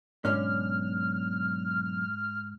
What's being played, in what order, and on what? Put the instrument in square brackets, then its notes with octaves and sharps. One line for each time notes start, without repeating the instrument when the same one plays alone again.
[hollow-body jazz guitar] B1 D3 C#4 [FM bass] G#2 [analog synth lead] F6